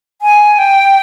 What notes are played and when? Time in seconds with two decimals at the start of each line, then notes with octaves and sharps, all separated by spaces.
0.22 G#5
0.58 G5